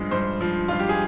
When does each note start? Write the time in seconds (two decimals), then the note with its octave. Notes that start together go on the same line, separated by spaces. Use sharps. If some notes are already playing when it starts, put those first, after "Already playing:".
Already playing: G2 F3 G#3 D#5
0.11 G2 C5
0.41 F3
0.68 G2 F4
0.79 G4
0.89 G#4